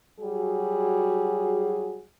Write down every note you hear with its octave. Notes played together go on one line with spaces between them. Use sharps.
F#3 G3 F#4 G#4